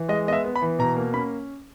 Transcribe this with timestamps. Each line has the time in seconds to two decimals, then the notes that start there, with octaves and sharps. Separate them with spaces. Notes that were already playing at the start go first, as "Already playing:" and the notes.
Already playing: E3
0.08 G#3 D#5
0.27 B3 D#5
0.33 E5
0.45 B3
0.56 B5
0.62 E3
0.79 B2 A#5
0.97 A#3
1.14 C#4 B5